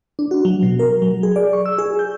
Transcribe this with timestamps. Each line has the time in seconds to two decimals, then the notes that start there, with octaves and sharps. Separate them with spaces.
0.19 D4
0.31 F#4
0.45 F#3
0.63 B2
0.79 A#4
1.02 F#3
1.23 G#4
1.36 D5
1.53 C#6
1.66 E6
1.78 G#4
1.99 G6